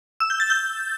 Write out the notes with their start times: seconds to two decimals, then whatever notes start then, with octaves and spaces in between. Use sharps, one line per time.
0.20 E6
0.30 G6
0.40 A6
0.50 G6